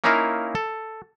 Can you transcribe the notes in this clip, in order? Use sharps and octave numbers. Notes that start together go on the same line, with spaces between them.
A#3 C#4 D#4 E4 A#4 F5
A4